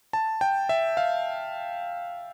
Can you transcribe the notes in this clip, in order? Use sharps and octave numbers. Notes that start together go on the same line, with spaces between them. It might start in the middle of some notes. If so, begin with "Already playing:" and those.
A5
G5
E5
F5